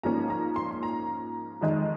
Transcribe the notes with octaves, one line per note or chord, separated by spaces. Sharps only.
G#2 F3 A#3 C#4 A#5
A#5
C6
C6
A#5
F2 D#3 G#3